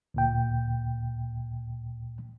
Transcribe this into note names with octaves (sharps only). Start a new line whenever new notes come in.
D2 A#2 G5